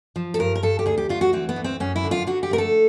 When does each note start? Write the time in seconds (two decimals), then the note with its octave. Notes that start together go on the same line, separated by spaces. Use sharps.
0.16 F3
0.34 A4
0.39 G2 A#4
0.56 A#4
0.63 G2 A4
0.79 G4
0.86 D2 G#4
0.98 G4
1.09 D2 F4
1.21 F#4
1.33 E3 C4
1.49 B3
1.56 D2
1.64 C4
1.80 F#2 C#4
1.96 E4
2.04 D3
2.11 F4
2.27 D3 F#4
2.43 G4
2.51 A3 A#4
2.58 A4